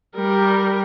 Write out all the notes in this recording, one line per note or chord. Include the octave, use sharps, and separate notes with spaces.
G3 A#4